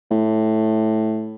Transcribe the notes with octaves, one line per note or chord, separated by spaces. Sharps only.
A2